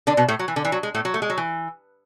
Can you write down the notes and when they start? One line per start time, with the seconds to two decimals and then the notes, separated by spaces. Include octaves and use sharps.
0.07 D3 D4
0.17 B2 B3
0.28 A2 A3
0.39 F#3
0.48 E3
0.56 D3
0.65 E3
0.72 F#3
0.83 G#3
0.94 A2 A3
1.05 F#3
1.14 A3
1.22 G#3
1.30 F#3
1.37 E3